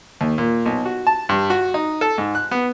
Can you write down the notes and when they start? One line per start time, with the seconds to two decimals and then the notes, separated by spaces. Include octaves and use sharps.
0.21 D#2
0.38 A#2
0.66 B1
0.86 F#4
1.07 A5
1.29 G2
1.50 F#4
1.74 D#4
2.01 A4
2.18 G#2
2.35 F#6
2.51 B3